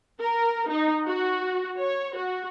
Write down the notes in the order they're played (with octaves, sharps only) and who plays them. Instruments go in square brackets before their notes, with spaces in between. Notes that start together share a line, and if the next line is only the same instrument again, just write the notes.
[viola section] A#4
D#4
F#4
C#5
F#4